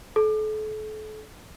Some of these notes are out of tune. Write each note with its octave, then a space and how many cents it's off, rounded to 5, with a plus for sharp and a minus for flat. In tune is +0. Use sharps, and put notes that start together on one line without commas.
A4 -35